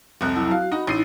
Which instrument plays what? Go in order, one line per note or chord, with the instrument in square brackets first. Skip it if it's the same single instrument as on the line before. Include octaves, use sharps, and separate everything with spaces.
[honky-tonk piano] F1 C2 F#6
[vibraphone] F#3 E4 A5
[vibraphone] F#4 [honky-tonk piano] F5
[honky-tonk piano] D#4 F#4 [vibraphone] B5
[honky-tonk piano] A1 C7 D#7 [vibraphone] D#4 E4